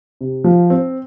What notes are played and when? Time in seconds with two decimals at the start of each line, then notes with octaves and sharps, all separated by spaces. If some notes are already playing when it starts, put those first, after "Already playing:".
0.21 C3
0.44 F3
0.70 C4